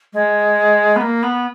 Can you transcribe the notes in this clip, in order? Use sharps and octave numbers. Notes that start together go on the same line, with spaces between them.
G#3
B3
A#3
B3